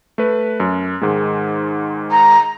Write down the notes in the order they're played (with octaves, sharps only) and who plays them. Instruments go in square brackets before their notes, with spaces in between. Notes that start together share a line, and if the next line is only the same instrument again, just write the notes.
[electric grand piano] A3 B4
F#2
G#2 D#3 G#3
[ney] A#5